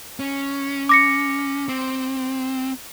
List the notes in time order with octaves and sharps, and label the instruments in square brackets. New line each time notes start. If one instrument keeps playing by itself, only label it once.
[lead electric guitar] C#4
[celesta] D6 A#6 C#7
[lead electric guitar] C4